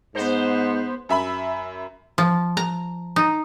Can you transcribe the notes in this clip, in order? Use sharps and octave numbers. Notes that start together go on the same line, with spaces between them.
G#2 B3 C5
F#2 E5 B5
F3
A#5
D#4